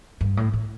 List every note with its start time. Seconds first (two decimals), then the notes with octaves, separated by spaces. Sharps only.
0.21 G2
0.37 A2
0.54 A2